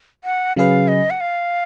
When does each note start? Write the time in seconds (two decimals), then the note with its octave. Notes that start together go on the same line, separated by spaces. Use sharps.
0.24 F#5
0.56 C#3 F#3 C#4 G#4 B4 F5
0.88 D#5
1.10 F#5
1.21 F5